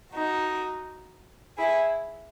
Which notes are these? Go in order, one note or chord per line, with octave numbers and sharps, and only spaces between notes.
D#4 F#4
E4 G#4